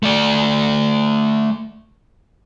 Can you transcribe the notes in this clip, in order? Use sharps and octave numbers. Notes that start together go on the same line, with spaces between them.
A3 D5